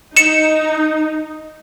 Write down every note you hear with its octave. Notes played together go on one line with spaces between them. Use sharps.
D#4 C#7 E7